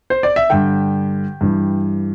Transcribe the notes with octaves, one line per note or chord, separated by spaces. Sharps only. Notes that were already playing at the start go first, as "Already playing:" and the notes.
C5
D5
E5
G2 D3 G5
G2 E3